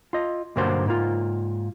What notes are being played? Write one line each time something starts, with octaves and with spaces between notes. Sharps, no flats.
F4 D#5
B1 G2 D3 A#3 F#4 C5
G#2 A#3 F4